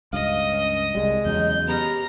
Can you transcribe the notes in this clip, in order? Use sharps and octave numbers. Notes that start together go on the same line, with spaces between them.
C#2 G2 D#5 F5
C#4
C2 G3 G#3 D#5
E2 C#3 F#3 G6
B3 G4 A#5 F6